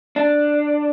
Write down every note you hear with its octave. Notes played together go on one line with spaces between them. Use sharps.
D4